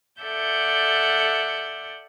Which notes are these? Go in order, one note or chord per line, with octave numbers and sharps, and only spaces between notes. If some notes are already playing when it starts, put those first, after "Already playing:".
A4 D5 E5 F#5 G6